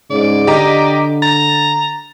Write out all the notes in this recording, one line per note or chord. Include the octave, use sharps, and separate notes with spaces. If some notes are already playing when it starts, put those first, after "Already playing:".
G#2 C#3 D5
D3 G4 D#5 A#5
A#5 A6